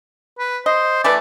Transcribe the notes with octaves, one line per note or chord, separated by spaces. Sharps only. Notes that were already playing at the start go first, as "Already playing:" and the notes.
B4
C5 D#5
E3 A3 B4 D5